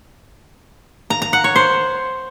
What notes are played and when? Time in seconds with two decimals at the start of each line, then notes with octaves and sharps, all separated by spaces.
1.10 A#5
1.22 A#5
1.33 F#5
1.44 C#5
1.56 C5